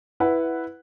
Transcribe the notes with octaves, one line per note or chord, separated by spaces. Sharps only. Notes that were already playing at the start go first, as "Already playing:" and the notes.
E4 B4 F#5